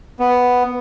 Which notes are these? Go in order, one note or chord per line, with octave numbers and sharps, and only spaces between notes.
B3